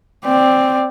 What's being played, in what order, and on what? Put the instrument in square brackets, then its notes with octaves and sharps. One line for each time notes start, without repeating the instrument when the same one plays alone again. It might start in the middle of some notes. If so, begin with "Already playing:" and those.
[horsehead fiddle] C4 D5